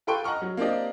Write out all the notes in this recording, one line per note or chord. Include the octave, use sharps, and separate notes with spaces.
F4 A4 B4 G5 C6 C#6
D#5 F#5 A#5 C#6 F6
F#3
A#3 C4 D4 G4 D5 D#5